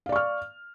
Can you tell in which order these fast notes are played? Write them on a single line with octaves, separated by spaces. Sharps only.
F5 D5 C#6 F6